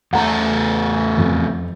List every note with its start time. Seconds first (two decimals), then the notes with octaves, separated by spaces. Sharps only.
0.13 E2 A3 F#5 A5 A#5
1.18 F2